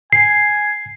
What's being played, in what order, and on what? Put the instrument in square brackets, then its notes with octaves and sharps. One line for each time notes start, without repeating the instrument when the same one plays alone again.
[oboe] G#5 [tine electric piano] C7